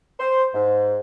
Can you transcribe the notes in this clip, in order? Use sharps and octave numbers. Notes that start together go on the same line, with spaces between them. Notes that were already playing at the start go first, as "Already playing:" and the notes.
C5
G#2